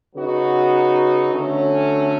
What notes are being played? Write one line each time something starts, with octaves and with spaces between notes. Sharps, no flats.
C#3 F#3 B3 D#4 F#4
D3 F#3 A3 C#4